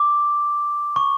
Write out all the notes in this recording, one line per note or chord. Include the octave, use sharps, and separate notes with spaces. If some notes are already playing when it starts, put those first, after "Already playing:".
Already playing: D6
C#6